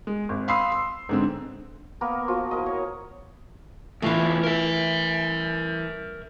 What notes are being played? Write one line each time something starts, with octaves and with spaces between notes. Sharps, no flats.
G#3
G#1
F5 B5 C6 D#6 E6 C7
C6
G#2 D3 C4
A#3 B3 A#4
F3 F4 F#4
E4 A#4 D#5
C#5
E2 E3 A3 F4
A#4 E5